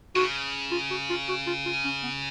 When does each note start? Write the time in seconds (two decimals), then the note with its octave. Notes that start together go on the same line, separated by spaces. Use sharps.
0.16 C#3 F#4
0.71 F4
0.90 F#4
1.09 F4
1.29 F#4
1.47 F4
1.65 F4
1.85 C#4
2.03 B3